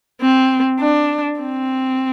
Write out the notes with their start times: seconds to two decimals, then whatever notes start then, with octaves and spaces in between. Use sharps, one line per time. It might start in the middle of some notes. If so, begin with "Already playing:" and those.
0.21 C4
0.80 D4
1.40 C4